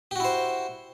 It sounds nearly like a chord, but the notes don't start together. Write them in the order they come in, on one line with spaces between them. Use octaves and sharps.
G4 F#4 E4 C5